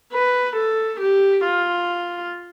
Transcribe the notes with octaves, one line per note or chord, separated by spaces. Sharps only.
B4
A4
G4
F4